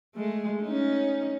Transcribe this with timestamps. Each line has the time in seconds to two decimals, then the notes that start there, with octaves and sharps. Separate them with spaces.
0.15 G#3 A3
0.62 C#4 D#4